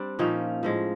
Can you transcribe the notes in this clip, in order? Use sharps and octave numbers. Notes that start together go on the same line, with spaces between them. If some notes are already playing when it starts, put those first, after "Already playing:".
Already playing: G3 C4 D4
A#2 F3 A#3 C#4 D#4
A2 F3 G#3